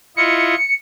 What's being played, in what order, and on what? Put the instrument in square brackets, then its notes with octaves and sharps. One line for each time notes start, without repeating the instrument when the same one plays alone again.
[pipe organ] E4 F4 D#5 [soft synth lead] C#7